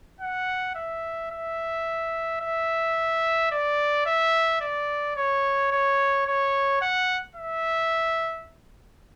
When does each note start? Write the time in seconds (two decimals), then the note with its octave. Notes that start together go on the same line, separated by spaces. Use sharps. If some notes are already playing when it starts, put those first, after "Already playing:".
0.21 F#5
0.75 E5
1.31 E5
2.41 E5
3.51 D5
4.06 E5
4.61 D5
5.16 C#5
5.71 C#5
6.26 C#5
6.81 F#5
7.36 E5